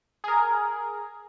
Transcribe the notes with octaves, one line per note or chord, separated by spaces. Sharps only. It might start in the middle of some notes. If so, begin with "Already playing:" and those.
G#4 A#4